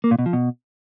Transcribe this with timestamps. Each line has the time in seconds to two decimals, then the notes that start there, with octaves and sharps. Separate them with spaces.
0.04 A#3
0.11 A#2
0.19 B2
0.26 F3
0.33 B2